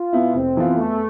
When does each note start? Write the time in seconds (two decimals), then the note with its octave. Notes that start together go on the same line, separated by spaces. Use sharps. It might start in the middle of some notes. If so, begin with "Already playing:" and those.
Already playing: F4
0.13 B2 B3 E4
0.34 F1 C4
0.56 F2 E3 B3 F4
0.76 E2 A3